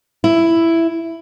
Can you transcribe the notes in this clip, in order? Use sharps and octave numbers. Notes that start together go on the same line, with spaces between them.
E4